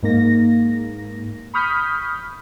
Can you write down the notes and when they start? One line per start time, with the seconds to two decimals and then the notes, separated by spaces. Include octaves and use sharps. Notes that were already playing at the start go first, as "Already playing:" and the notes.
0.03 G#2 A#3 A#6
1.54 B5 C#6 D#6 F6 G6 B6